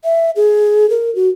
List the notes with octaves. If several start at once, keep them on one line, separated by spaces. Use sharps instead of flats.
E5
G#4
A#4
F#4